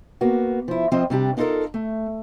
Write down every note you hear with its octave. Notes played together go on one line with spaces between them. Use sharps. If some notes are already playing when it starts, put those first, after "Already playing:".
A#3 B3 F#4
F3 E4
F2 F3 C4 F4 D#5
C3 G3 D4 G4
D4 D#4 F4 F#4 A4 A#4
A3